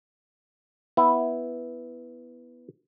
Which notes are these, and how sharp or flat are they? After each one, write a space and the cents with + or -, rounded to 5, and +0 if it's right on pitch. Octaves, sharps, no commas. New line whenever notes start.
B3 +0 E4 +0